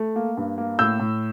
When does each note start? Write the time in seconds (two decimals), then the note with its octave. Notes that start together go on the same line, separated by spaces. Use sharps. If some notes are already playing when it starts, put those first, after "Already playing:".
Already playing: A3
0.16 A#3
0.37 G2
0.58 A#3
0.79 A2 E6 G6
1.00 A2